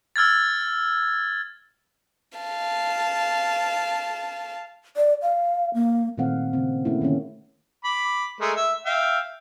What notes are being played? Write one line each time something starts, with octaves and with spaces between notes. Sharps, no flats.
E6 F6 G#6 A6
F5 A5
D5
F5
A#3
A#2 D#3 A3 C4 F5 F#5
C#3 C4
A3 A#3 C#4 E4
D3 D#3 A3 A#3 C#4
B5 D6
G#3 A3 A#4
E5
E5 F5 G5